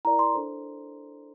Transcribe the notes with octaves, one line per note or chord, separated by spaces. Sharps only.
E4 A#4 D5 A#5
C6
D4 A4 C5